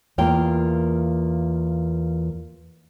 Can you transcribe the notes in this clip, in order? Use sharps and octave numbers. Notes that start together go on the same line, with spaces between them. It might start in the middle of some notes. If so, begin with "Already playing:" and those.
E2 A#3 F4 G5